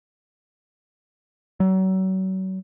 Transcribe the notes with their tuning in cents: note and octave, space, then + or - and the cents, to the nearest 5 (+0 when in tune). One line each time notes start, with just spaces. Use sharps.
F#3 +35